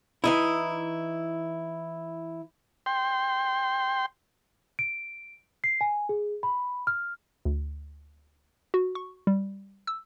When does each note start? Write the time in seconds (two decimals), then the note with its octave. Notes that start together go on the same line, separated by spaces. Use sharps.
0.24 E3 D#4 E4
2.86 G5 C6
4.79 D7
5.64 C7
5.81 G#5
6.09 G#4
6.43 B5
6.87 F6
7.45 D2
8.74 F#4
8.95 C#6
9.27 G3
9.87 E6